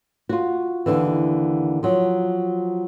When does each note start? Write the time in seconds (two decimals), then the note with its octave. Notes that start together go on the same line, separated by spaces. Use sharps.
0.29 F4 F#4
0.86 D#2 D3 E3
1.83 F3 F#3